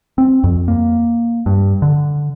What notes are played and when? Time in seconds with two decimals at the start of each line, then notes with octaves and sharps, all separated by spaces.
0.18 C4
0.44 F2
0.68 A#3
1.46 G2
1.82 D3